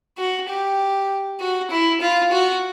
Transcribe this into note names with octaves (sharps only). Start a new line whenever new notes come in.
F#4
G4
F#4
E4
F4
F#4